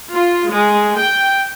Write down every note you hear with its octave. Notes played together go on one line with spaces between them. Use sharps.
F4
G#3
G5